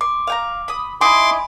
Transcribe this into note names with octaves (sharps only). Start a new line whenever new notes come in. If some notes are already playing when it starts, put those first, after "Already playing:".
C6 D6
F5 G5 A#5
B5 D#6
D#4 E4 G#5 B5 C6 D6